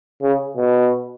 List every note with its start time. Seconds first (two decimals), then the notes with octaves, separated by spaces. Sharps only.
0.22 C#3
0.57 B2